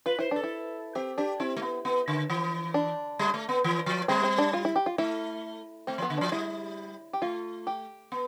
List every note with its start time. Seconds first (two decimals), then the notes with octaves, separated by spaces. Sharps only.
0.06 F4 B4
0.19 E4 C5
0.31 D4 A4
0.43 E4
0.95 C4 G4
1.18 D4 G4
1.40 C4 E4
1.57 A3
1.62 B3
1.85 B3
2.08 D3
2.30 E3
2.74 D4
3.19 G3
3.34 A3
3.49 B3
3.64 E3
3.86 F3
4.08 G3 C4
4.23 C4
4.38 D4
4.53 F4
4.65 E4
4.76 G4
4.86 F4
4.98 A3 E4
5.87 A3 C4
5.98 F3
6.02 B3
6.10 D3
6.18 F3 D4
6.32 G3 E4
7.13 G4
7.22 A3 F4
7.67 G4
8.12 B3